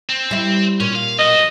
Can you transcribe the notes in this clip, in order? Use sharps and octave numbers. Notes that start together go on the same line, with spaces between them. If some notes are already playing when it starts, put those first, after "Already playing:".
C4
G3 E4
A#2 C#4
F5
B1 F#4 D#5